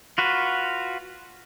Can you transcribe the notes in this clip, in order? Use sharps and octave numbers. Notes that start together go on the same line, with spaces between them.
F4 F#4 B4